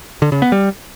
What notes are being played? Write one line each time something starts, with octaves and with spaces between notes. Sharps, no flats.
D3
C#3
B3
G3